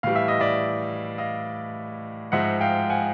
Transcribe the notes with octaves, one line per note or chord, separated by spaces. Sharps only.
A2 E3 G3 F5
E5
D#5
D5 E5
D#5 F5
G#2 F3 G#3 E5 F#5
F5 G5
F#5 G#5